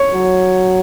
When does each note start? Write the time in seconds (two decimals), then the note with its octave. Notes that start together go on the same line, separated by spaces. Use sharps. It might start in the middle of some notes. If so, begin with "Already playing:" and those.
Already playing: C#5
0.13 F#3